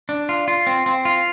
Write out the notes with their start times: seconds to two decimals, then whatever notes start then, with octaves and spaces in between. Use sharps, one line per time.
0.09 D4
0.29 F4
0.48 F4
0.67 C4
0.86 C4
1.05 F4